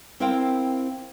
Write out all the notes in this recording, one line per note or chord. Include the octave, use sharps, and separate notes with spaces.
C4 E4 A#4 C5 F5 G5